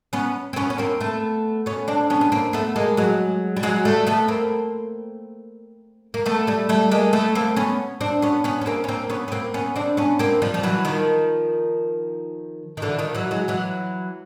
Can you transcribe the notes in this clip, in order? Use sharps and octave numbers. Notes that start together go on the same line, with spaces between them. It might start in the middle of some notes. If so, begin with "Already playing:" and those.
B3 C#4
C4
B3 C#4
C#4
A#3 C4
A3 B3
B3 C#4
C4 D4
B3 C#4
B3
A#3 C4
A3 B3
G#3 A#3
F#3 G#3
G3
F#3 G#3
G3 A3
A3 B3
A#3 C4
A#3
A3 B3
G3 A3
G3 A3
G#3 A#3
A3 B3
A#3 C4
B3 C#4
C4 D4
B3 C#4
B3 C#4
C#4
A#3 C4
C#4
A#3 C4
B3 C#4
B3
A#3 C4
B3 C#4
C4 D4
B3 C#4
A#3 C4
F3 G3
F3
E3 F#3
D#3 F3
D#3
D3 E3
D#3 F3
E3 F#3
F#3 G#3
E3 F#3